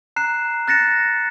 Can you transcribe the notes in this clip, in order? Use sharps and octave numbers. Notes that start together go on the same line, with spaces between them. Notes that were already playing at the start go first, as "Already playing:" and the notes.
A#5 F#6 C7 E7
F#6 A6 A#6 C#7 E7